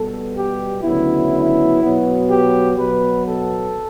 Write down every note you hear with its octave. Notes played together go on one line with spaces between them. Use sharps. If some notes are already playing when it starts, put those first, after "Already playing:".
Already playing: B2 G3 B3 A4
G4
D2 C#3 F#3 B3 E4
B2 F#3 B3
G4
B2 F#3 B3 B4
A4